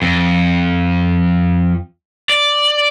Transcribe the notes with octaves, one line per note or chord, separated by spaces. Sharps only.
F2
D5